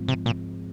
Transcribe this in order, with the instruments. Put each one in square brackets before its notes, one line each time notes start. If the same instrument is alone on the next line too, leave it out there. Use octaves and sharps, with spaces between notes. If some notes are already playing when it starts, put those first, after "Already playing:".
Already playing: [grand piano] G#2 F3 C4
[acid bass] C3
A#2